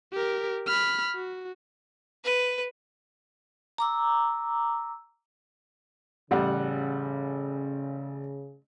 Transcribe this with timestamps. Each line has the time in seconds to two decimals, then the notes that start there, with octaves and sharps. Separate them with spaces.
0.13 G4 A#4
0.67 B5 F6
1.14 F#4
2.25 B4
3.78 A#5 D6 E6
6.31 A1 C#3 G3 F#5